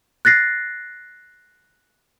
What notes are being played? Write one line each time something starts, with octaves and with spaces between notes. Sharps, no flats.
F#6 A6 A#6 C7